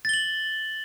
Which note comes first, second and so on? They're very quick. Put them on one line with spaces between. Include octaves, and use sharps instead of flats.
A6 G7 F#7